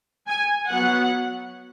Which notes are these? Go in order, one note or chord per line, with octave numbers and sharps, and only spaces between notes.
G#5
F#3 B3 F#5